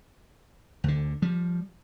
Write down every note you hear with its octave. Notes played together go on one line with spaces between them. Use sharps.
D2 D3
F3 G3